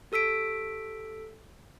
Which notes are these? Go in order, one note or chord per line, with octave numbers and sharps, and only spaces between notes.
G4 A4 E6 B6 D7